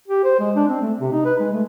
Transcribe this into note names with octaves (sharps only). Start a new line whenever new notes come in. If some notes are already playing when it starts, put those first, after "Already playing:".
G4
C5
G#3
D4
C4
A3
C3
D#4
B4
G#3
A3